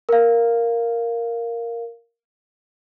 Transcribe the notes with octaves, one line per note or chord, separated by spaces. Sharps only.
A#4 F5